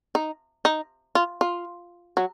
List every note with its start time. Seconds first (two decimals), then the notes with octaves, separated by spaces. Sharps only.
0.15 D#4
0.65 D#4
1.15 F4
1.41 F4
2.17 F#3